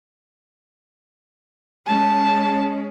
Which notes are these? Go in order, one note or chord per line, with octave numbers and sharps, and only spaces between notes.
G#3 C#4 A5